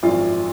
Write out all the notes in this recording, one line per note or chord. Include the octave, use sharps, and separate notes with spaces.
G#1 F#2 F3 F4